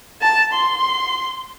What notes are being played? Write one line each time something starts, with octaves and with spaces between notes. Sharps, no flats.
A5
C6